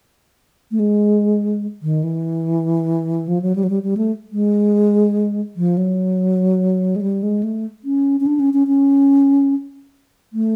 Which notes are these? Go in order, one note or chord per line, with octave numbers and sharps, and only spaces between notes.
A3
G#3
D#3
E3
F3
F#3
G3
F#3
G3
G3
A3
G#3
F3
F#3
G#3
G3
G#3
A3
C#4
C#4
D4
C#4
C#4
C#4
A3